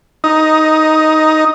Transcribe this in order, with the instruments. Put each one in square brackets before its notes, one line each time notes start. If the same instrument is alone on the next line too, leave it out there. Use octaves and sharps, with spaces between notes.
[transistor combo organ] D#4